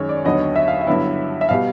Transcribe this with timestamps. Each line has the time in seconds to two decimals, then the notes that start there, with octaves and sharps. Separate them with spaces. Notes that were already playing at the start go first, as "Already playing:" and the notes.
Already playing: F#2 D#3 G#3 C#4 C#5
0.09 D5
0.24 D#2 D3 F#3 B3 D#5
0.56 E5
0.68 F5
0.81 E5
0.87 G2 D3 F#3 B3 E4
1.41 E5
1.49 B2 G3 F5